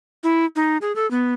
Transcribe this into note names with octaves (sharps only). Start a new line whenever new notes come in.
E4
D#4
G#4
A4
B3